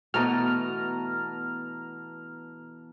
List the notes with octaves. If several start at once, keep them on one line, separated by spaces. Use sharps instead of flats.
B2 E3 A3 B3 A5 A#5 D#6 F6